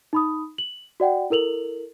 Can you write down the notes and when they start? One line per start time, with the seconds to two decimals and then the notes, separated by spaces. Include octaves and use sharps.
0.13 D#4 B5 D#6
0.58 F#7
1.00 F#4 D5 F#5 G5
1.30 E4 A4 A#4 F7 F#7